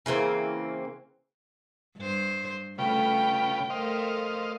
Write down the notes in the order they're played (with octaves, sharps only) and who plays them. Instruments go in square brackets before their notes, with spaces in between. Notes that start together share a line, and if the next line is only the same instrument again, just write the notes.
[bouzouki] C#3 E3 A#3 C4
[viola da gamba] G2 C5
[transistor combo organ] C#3 F4 B4 [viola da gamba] A3 [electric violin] G5
[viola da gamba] A3 A#4 [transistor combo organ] C5 D#5 F5